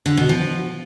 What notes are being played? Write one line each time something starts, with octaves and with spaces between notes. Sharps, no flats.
D3
B2
F3